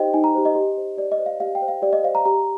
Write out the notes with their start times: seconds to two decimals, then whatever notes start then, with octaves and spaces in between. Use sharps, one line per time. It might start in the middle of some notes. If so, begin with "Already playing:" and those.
Already playing: D#4 G4 C5 D#5 G5
0.14 D#4 G#5
0.24 A#5
0.35 G4 C5
0.45 D#5
0.55 G4
0.77 C5
0.97 G4 D5
1.12 D#5
1.19 C5
1.26 F5
1.40 G4 F5
1.55 G5
1.62 C5
1.68 F5
1.82 G4 D5
1.93 D#5
2.04 C5 F5
2.15 A#5
2.25 G4 A#5